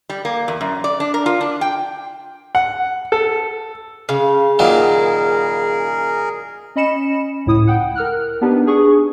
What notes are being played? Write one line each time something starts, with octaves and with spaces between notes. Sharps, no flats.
G3
A#3
E2
F#2
D5
D4
A#4
F4
D4
G5
F#5
A4
C#3 F5
A#2 D#3 F#3 G#4 A#4
C#4 D#5 B5 C#7 E7
C#2 A2 E4 D#6
F#5 G5
A#4 F6 F#6
B3 D4 D#4 G4 B4
D4 G#4 C#6